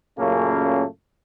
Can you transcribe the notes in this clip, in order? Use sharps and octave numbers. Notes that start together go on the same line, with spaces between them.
F#2 A#2 C#3 A3 A#3 C#4